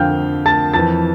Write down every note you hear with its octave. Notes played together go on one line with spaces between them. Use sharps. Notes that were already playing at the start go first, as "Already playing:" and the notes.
Already playing: F2 D3 F3 F5 G5 F6 G6
A5 A6
F2 E3 A5 A6